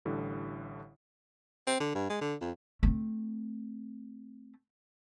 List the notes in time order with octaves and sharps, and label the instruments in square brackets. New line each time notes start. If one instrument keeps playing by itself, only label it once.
[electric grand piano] A1 A2 D3 G3
[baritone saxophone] C4
D3
G2
G#3
D3
F2
[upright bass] A3 C4